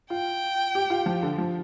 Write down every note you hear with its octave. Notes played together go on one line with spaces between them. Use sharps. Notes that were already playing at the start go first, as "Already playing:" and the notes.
F4 G5
G4
F4
F3
D3
F3